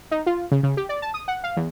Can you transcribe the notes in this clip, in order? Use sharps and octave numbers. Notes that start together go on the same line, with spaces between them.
D#4
F4
C#3
C#3
G4
D5
A5
D#6
F#5
F5
E2